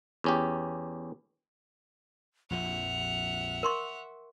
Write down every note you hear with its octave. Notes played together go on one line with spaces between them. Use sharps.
E2 C#4 G4
A#1 F2 F3 E5 F#5 F7
A#4 C6 C#6